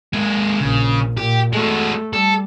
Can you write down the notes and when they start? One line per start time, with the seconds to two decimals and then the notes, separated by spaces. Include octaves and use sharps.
0.13 G#3 A#3
0.61 A#1 C#3
1.17 A#2 G4
1.53 G#3 A3 F#4
2.13 G3 A4